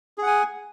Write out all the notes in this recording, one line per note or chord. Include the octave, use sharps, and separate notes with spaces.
G#4 F#5 G#5